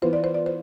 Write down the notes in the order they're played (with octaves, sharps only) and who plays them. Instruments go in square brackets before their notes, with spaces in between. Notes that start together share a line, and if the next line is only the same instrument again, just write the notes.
[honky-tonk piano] E3 B3 F4 [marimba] C5
[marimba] D5
C5
D5
C5